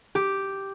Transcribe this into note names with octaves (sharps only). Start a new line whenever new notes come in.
G4